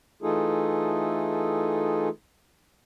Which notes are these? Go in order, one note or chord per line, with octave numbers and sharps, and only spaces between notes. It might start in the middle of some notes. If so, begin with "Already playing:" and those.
E3 A3 D#4 F4 G#4 A4